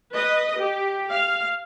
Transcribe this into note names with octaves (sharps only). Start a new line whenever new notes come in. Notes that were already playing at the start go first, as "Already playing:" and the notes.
B4 D#5
G4
F5